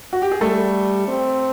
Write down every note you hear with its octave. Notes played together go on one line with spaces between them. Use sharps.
F#4
G4
G#4
G3 A3 A4
C4